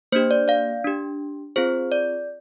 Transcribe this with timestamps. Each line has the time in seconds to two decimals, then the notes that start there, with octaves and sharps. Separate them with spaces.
0.12 A#3 D4 G4 C5
0.31 D5
0.48 D5 F5
0.84 D4 G4
1.56 C4 F4 G#4 C5
1.92 D5